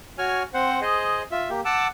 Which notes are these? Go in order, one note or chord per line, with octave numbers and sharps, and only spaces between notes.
F#4 C#5 G#5 F6
C4 C5 F#5
G#4 C5 D#5
F4 E5
A#3 G4
F#5 A5 D6 E6